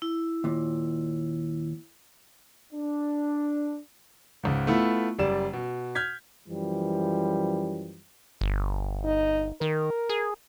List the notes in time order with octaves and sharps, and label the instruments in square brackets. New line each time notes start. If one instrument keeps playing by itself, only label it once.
[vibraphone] E4
[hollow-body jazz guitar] D#2 A#2
[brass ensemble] D4
[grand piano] C#2 G#2
A3 B3 E4 F4
F#1 G3 D5 E7
B2
F6 G6 G#6 B6
[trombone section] F#2 E3 F3 G3
[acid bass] G1
[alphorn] D#4
[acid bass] D#3 [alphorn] A#4
[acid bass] G#4